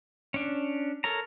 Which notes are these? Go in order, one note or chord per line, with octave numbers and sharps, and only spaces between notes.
C#4 D4
A4 A#4 C#5 A#5